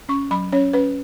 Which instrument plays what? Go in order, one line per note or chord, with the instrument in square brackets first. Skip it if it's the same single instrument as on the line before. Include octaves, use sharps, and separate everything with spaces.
[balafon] C#4 C#6
F#3 B5
C#4 C#5
C#4 B4